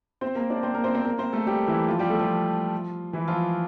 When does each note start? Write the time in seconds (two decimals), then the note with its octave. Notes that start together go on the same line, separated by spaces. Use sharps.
0.21 C4 C5
0.35 A#3 A#4
0.50 D4 D5
0.63 C4 C5
0.74 A#3 A#4
0.84 C4 C5
0.95 C4 C5
1.05 A#3 A#4
1.19 C4 C5
1.33 A3 A4
1.46 G3 G4
1.67 E3 E4
1.88 F3 F4
1.99 G3 G4
2.09 A3 A4
2.19 F3 F4
3.13 E3 E4
3.28 F3 F4